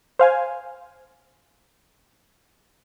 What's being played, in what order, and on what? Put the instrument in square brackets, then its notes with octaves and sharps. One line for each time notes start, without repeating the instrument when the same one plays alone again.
[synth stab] C5 F5 G#5